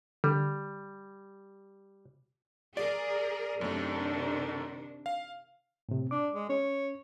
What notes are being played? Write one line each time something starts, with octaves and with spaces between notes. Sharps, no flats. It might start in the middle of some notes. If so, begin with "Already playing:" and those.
D3 G3
G#4 A#4 D5
F#2 C3 D#3 A3 D4
F5
A2 C3
D4 D6
G#3
C#4 C#5